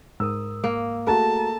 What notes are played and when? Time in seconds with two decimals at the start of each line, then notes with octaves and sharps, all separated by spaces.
0.20 G#2 A#4 D#6 E6
0.64 A#3
1.07 A3 F#4 G#4 A4 A5 A#5